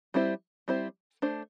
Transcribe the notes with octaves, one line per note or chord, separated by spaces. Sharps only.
G3 C4 E4 C5
G3 C4 E4 C5
A3 D4 C5